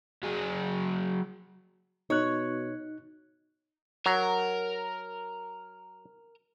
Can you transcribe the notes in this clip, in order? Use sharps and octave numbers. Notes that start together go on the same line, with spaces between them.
F#3 G#4
B2 D#4 C#5 F#6
F#3 A#4